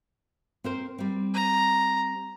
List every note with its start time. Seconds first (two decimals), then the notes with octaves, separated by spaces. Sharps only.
0.64 C4 A#4 C5
0.98 G3 C4
1.34 A#5